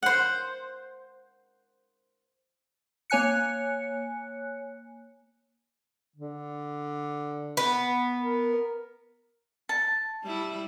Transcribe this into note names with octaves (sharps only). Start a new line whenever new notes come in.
C5 F#5
A#3 C#5 G#5 F#6 C#7
D3
B3
A#4
A5
G3 E4